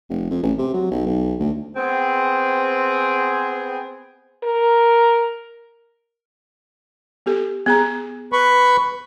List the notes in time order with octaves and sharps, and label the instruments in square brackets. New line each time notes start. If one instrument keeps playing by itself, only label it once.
[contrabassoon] F1
F2
A1
C3
F#3
B1
B1
D2
[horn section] B3 C4 G#4
[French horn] A#4
[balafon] B3 G4 A4
B3 G#4 A#5
[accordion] B4 B5 C#6